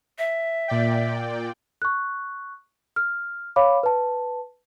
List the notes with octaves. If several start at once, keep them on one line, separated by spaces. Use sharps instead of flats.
E5
A#2 D5 G5
C#6 F#6
F6
C#5 F5 B5 D6
B4 A5